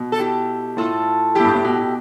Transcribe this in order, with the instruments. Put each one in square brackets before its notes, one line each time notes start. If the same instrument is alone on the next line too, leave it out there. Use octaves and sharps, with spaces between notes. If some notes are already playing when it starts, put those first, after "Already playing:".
Already playing: [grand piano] B2
[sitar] A4
E4 G4
[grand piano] A2 [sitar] F4 A4
[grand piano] A2 [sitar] E4 G4
[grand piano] G2
A2
B2
B2